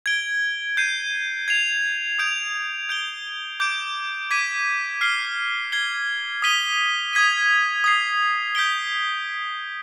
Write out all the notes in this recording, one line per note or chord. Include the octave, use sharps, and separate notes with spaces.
G#6 D7 G7
G6 C7 D#7
G#6 C7 F7
D#6 G6 D7 F7
G6 D7 G7
D6 G6 D7
D6 G#6 B6 D#7
F6 C7 G7
G#6 C7 G7
D#6 B6 D#7 G7
D#6 G#6 B6 D#7
D#6 G#6 C7
G6 B6 D7 G7